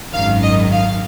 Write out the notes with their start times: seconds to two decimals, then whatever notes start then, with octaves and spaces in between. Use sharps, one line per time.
0.13 G#1 F#2 D#3 F5
0.42 D#5
0.71 F5